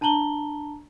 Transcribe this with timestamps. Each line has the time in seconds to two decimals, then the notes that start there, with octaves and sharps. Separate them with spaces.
0.01 D4 A5 A#5 F#7 G7